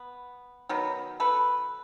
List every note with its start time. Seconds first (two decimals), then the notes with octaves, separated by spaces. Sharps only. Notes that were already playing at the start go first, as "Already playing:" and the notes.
Already playing: B3
0.69 D#3 F#3 B3
1.20 A4 B4